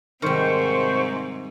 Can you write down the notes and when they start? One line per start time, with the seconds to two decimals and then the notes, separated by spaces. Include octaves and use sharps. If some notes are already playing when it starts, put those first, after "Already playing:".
0.22 G#2 C3 D#3 G3 C5 C#6